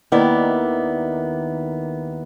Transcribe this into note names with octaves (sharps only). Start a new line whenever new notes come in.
D#2 D#3 B3 E4 D5